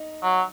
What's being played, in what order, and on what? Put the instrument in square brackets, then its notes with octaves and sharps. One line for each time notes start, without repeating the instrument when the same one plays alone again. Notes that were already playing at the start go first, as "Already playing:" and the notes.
Already playing: [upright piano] D#4
[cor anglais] F#3